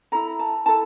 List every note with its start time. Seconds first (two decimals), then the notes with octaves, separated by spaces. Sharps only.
0.12 E4 A4 A#5
0.39 A5
0.66 E4 A4 A5